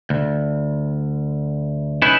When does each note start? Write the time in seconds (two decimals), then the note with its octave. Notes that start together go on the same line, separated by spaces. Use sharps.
0.10 D2
2.02 C#4 D#4 E4 B4